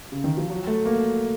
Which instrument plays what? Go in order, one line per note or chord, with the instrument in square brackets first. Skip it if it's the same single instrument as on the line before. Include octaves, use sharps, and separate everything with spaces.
[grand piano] C#3
D#3
F3
F#3
A3
A#3